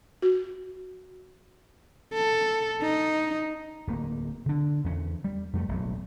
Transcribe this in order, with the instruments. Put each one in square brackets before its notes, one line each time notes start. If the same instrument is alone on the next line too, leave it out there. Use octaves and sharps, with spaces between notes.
[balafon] F#4
[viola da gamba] A4
D#4
[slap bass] D1 A#3
D3 D4
E2 C#4
G3
F2 G3 A3
E1 B1 A2